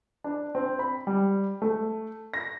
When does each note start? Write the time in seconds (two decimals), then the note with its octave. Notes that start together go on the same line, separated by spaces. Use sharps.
0.24 D4
0.55 C4
0.79 B5
1.07 G3
1.62 A3
2.34 A#6